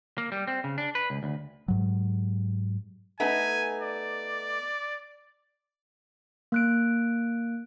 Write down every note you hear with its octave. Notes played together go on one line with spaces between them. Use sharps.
A#3
G3
C4
C#3
D4
B4
C#2
D2
G#2 F#3
A3 B3 D#4 G#5
D5
A#3 F#6 D7